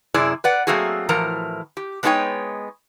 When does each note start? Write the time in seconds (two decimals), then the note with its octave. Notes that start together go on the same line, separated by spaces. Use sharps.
0.14 F#2 C3 E4 G#4 D5
0.44 B4 D5 F#5
0.67 F#3 A3 A#3 C4 F#4 G#4
1.09 A2 E3 F3 A#4 A#5
1.77 G4
2.03 G#3 B3 D#4 F#4 C#5 G5